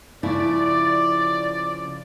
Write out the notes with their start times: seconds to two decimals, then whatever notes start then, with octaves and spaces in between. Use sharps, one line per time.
0.23 C#3 F3 E4 D5